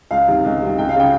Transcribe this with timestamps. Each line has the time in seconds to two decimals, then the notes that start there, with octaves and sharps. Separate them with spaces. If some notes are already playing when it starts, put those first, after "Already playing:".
0.11 C#2 F5
0.28 C3 D#3
0.44 C#2
0.62 C3 D#3
0.78 C#2 G5
0.89 F5
0.96 C#3 G5